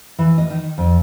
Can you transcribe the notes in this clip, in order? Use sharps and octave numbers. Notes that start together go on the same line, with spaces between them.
E3
D#5
D#3
F2